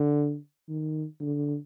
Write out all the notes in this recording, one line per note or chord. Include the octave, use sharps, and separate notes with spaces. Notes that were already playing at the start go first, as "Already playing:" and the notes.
Already playing: D3
D#3
D3